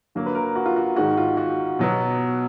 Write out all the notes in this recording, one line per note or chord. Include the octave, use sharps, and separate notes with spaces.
D3 F#3 A#3
B4
A#4
F#4
F4
F#4
G#2 D#3 G#3 F#4
F4
F#4
B2 F#3 B3